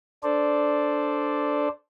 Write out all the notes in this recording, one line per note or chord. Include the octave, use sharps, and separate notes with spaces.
D4 A4 C5 D5